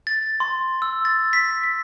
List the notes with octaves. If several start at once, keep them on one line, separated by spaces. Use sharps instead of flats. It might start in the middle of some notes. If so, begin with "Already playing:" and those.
A6
C6
E6
A6
B6
B6